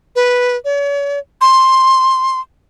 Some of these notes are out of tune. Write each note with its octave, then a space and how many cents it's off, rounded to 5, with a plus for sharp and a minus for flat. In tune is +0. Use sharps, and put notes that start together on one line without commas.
B4 -5
C#5 +40
C6 +10